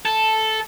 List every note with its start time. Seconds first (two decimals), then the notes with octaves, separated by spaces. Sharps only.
0.05 A4